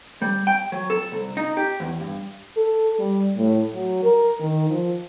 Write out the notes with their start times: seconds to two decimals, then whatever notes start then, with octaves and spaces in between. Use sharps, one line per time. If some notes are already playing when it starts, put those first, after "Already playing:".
0.22 G3
0.47 G5
0.72 F#3
0.90 A4
1.12 C2
1.37 D#4
1.57 G4
1.80 E2
2.01 G2
2.57 A4
2.99 G3
3.37 A2
3.73 F#3
4.03 A#4
4.39 D#3
4.70 F3